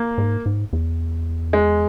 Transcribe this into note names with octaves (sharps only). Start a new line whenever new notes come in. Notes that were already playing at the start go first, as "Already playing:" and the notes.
Already playing: A#3
G#2
G#2
E2
G#3